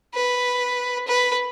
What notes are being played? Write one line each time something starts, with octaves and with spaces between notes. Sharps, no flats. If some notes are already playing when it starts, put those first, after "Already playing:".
B4
B4